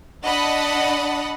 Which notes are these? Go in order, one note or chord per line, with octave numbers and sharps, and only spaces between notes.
D4 D#5 F#5 A5 B5